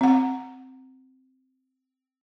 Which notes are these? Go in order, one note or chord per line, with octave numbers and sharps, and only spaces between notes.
C4 F#5